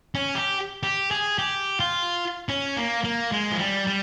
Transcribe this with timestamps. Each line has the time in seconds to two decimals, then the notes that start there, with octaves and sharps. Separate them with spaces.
0.15 C#4
0.35 G4
0.83 G4
1.11 G#4
1.39 G4
1.80 F4
2.49 C#4
2.77 A#3
3.04 A#3
3.32 G#3
3.51 F3
3.59 G3
3.87 G3